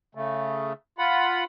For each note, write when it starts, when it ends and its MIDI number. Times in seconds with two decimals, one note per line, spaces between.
0.15 0.73 49
0.15 0.73 57
0.99 1.44 65
0.99 1.44 78
0.99 1.44 83